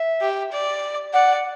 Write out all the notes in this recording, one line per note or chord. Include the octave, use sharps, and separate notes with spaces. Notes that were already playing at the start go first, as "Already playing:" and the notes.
Already playing: E5
G4
D5
D5 F#5